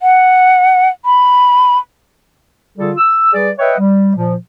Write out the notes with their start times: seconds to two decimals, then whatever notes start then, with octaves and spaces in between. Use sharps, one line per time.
0.01 F#5
1.05 B5
2.78 D3 G3 F4 G#4 A4
2.98 E6
3.33 G3 G#4 B4 D5
3.59 B4 C#5 D#5 E5 F#5 G5
3.78 G3
4.16 A#2 F3